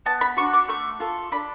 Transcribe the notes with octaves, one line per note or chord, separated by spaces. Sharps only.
B3 A5
B5
D4 F#4 C#6
D6
A3 C#6
F4 A4
D4 B5